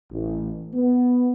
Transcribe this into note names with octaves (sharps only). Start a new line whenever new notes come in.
A1
B3